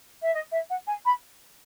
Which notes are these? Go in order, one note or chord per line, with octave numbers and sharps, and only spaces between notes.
E5
D#5
E5
F#5
G#5
B5